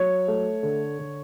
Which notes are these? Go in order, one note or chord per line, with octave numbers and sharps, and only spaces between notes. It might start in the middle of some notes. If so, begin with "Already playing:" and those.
Already playing: F#3 C#5
A3
D3
D3